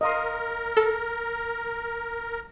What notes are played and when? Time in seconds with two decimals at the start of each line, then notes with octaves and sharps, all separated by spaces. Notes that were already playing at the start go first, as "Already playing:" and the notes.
0.01 A#4 D#5 F5 C6
0.77 A4